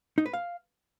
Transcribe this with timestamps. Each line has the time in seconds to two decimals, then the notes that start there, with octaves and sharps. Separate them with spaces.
0.18 D#4
0.26 B4
0.33 F5